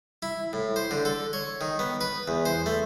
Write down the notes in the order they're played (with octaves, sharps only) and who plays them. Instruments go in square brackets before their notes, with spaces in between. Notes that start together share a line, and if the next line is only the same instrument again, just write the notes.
[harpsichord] E4
A2
C5
D3
A4
C#5
D#3
B3
B4
E2
C5
A3